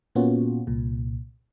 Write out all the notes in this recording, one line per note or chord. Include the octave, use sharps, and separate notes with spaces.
A#2 A#3 B3 C#4 F4 F#4
C2 A#2